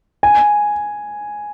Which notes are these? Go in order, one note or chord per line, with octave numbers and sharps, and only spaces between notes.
G#5